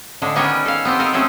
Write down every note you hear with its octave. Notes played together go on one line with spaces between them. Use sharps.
A2 D3 G#3
D#3 G3 B3 C#4 A#4 C#5
A4 F5
B3 C4 G4
A4 A#4 D#5 F5
G#3 A3 C4 C#4 G#4 A4